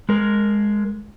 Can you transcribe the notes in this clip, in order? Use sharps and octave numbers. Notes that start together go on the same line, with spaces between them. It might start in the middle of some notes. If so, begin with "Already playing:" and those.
G#3 A#4